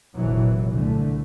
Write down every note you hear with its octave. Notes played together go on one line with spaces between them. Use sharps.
F1 A#1 E3 F#3
C2 D3 A3